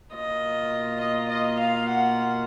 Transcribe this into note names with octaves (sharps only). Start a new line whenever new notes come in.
B2 A#3 F4 D#5
D#5
D#5
F5
F#5